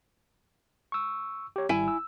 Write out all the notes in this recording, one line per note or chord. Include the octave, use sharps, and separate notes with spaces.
C#6 E6
G4 C#5
G#1 G3 E4 G#5
E6